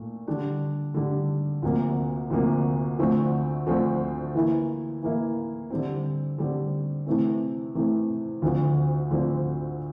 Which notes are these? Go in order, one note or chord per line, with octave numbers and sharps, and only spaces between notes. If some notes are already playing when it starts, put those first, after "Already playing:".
Already playing: A#2 A3
D3 G3 D4
D3 G3 D4
D2 C3 F3 A#3
D2 C3 F3 A#3
D2 D3 F3 A3 C4
D2 D3 F3 A3 C4
E3 A#3 E4
E3 A#3 E4
D3 G3 C4
D3 G3 C4
C3 E3 A3 C4
C3 E3 A3 C4
D2 D3 F3 C4
D2 D3 F3 C4